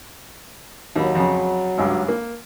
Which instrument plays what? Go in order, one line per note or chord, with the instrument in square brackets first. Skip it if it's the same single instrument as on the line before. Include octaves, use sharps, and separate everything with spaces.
[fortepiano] D#2 B5 [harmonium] F#3
[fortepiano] F2 C#3
G#1 C#2 G2
A#3